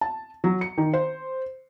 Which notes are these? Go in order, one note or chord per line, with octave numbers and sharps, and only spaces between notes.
A5
F#3
C#7
D#3
C5